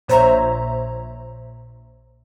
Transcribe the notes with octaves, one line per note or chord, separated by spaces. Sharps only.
A#1 A#2 C5 C#5 E5 A#5